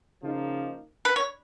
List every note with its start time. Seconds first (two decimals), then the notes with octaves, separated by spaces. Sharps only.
0.23 C#3 F3 A#3 D#4
1.05 B4
1.16 C#5